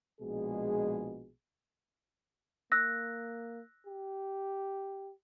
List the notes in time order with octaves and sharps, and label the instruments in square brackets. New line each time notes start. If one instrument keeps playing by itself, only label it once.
[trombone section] A#1 B2 G#3 G#4
[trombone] A#3 [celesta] E6 F#6 A#6
[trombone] G4